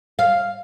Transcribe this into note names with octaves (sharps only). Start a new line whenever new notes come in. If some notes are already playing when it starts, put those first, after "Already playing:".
F5